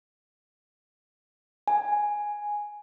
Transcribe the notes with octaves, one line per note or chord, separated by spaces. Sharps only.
G#5